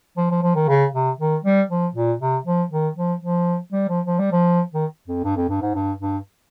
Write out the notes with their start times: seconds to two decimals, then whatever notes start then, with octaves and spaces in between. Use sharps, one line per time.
0.17 F3
0.31 F3
0.43 F3
0.55 D#3
0.68 C#3
0.93 C3
1.19 D#3
1.44 G3
1.69 F3
1.95 A#2
2.20 C3
2.45 F3
2.71 D#3
2.96 F3
3.21 F3
3.72 G3
3.89 F3
4.06 F3
4.19 G3
4.32 F3
4.74 D#3
5.08 F2
5.24 G2
5.37 F2
5.49 G2
5.62 G#2
5.75 G2
6.00 G2